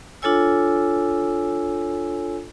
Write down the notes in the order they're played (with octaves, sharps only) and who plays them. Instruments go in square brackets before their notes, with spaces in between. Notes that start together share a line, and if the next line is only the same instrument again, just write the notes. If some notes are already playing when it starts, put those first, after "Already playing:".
[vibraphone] D4 F4 A4 C#5 G#5 E6